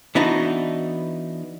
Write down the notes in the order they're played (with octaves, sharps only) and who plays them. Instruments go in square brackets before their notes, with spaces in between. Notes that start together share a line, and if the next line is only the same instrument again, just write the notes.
[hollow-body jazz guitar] E3 B3 D4 D#4 F#4